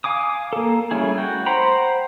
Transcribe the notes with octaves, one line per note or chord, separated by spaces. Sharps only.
F5 G#5 D6 D#6
A#3 A4
G3 A3 C#4 E4 G#4
F#4 G5
C5 F#5 G5 A#5 B5